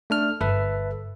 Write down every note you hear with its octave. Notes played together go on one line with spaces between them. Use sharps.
A3 D4 F6
G1 A4 B4 E5